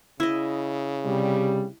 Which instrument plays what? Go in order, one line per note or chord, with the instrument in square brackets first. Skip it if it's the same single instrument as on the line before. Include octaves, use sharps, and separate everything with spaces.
[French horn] C#3 [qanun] E4 D#5
[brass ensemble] C3 G3